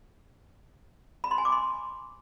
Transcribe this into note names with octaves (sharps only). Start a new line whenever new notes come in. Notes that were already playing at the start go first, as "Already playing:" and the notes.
B5
C6
G#5
D6
C6